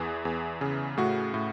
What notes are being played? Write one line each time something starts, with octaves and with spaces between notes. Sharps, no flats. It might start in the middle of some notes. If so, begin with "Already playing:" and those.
Already playing: E2 E3 G#4
E2
C#3
A2 F#4
A2